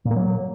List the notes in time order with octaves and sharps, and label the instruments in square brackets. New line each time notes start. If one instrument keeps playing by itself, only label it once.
[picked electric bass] A#2
A#3
F#3